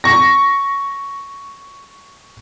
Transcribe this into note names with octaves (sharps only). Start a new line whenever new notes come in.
C#6 A#6